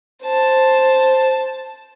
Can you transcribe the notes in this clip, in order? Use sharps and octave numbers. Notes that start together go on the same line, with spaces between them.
C5 A5